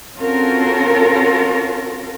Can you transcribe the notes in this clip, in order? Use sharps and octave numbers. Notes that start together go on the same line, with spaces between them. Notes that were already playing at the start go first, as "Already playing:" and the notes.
C4 C#4 F4 F#4 A4 A#4